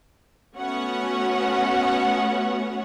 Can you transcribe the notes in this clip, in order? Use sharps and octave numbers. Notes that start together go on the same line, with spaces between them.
A3 B3 C#4 F#4 C#5 F#5